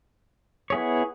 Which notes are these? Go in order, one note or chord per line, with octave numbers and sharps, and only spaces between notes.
B3 E4 G#4 C#5